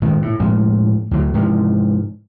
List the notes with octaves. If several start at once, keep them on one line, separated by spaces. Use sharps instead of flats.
G#1 A#2 D#3 G#3
A2
A2 F3 G#3 A#3
D2 D3 F#3
G#2 C3 E3 F3